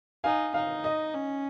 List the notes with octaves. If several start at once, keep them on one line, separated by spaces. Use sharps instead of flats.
D#4 F5 G#5
D#4 F5
D#5
C#4